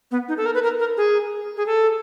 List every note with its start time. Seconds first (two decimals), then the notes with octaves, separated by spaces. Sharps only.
0.11 B3
0.29 D#4
0.37 A4
0.46 A#4
0.54 B4
0.63 A#4
0.79 A#4
0.97 G#4
1.57 G#4
1.66 A4